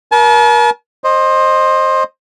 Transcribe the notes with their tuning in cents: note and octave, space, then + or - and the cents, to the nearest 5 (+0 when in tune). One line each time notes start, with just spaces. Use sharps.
A#4 +35 A5 -45
C5 +15 D#5 -10